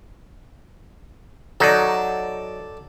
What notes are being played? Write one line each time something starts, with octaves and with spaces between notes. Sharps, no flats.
F#3 D#4 A4 D5